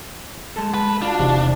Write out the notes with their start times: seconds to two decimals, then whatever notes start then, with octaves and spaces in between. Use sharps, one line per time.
0.56 G#3 A4 A5
0.74 B4
1.02 D4 F4 F#4
1.19 E1 C3 D#3